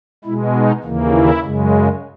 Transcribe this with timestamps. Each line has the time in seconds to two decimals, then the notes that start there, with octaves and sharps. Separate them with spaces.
0.24 B2 G#3 E4
0.55 D#4
0.84 D#2 C#3 E3 A#3
1.14 E4
1.42 F#2 C#3 G#3